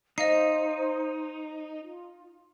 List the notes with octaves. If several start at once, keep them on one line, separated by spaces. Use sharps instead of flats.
D#4 C5 D#5 F5 C7
F4